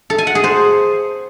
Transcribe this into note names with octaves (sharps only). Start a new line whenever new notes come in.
A4
G#5
F#5
G#4
C5